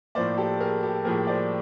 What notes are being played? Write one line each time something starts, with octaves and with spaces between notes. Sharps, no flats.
A2 F3 A#3 C5 D5
G4 A4
G#4 A#4
G4 A4
A2 F3 A#3 G#4 A#4
C5 D5